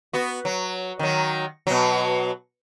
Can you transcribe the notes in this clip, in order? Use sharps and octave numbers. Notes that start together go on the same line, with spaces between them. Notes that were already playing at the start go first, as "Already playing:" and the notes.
B3 F#4
F#3
D#3 F#3
B2 F#3